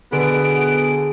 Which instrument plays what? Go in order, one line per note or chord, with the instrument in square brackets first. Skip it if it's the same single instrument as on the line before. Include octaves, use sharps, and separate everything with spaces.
[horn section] B2 B3 [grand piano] D3 [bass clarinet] G#4 [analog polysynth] D7